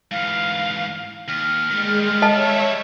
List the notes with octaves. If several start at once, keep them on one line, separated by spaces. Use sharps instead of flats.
G#2 E3 F5
D#2 F6
D#3 G3 G#3
A4 C#5 D#5 E5 A5